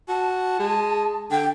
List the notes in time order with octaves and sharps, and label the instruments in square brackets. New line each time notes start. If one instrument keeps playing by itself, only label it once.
[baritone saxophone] F#4 [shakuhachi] A5
[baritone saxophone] G#3
[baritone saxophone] D3 [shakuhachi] G5